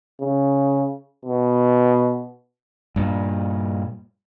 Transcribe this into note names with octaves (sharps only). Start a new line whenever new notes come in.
C#3
B2
G2 A#2